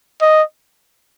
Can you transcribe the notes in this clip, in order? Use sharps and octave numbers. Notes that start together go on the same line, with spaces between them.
D#5